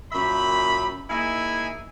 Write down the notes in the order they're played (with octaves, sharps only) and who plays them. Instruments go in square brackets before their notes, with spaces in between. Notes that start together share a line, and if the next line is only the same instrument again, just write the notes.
[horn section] F#2 A#2 E5 B5
A#3 D#4 E4 G#4 E5 G#5